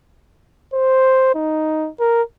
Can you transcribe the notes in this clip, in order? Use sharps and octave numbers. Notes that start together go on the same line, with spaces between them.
C5
D#4
A#4